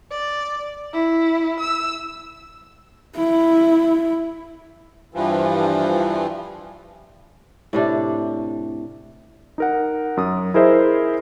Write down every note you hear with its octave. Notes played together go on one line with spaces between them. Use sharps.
D5
E4
E6
E4
G2 E3 F3
A2 C3 D4
D#4 A#4 F#5
F#2 D#6
E4 G#4 A#4 C5 D#5 E5